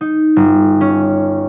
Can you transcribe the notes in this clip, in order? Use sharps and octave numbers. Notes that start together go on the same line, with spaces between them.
D#4
G1
C#4